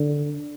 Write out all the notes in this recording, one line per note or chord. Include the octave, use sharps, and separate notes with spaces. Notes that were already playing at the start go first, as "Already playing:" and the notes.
Already playing: D3